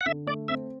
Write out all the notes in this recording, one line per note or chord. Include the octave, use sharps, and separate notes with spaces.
F#5
D3 E5
A3 D5
C4 E5